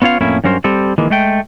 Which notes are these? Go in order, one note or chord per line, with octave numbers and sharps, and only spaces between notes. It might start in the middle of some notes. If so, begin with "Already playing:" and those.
B3 C#4 F4 C#5 F5
F2 A2 A#3 C#4 E4
G2 F#3 C#4 A#4 C5
G3 C4 A4
D#3 E3 G#3 A#3
G#3 A3 G5